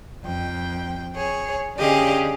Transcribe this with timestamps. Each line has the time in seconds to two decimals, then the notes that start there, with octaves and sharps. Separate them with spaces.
0.24 F2 G5
1.15 G#4 C#5
1.76 D3 C#4 G4 G#4 D#5 F5